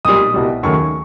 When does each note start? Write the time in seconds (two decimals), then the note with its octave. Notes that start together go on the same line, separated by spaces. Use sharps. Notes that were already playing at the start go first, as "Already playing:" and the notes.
0.05 B1 A#2 G3 D#6
0.34 C2 B2 G3
0.63 D#2 C#3 F#3 A3 C#6